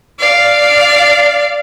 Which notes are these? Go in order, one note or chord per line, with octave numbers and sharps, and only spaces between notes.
D5 F5